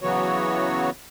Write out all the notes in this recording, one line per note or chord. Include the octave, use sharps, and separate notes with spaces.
C#3 E3 F#3 B3 F#4 C#5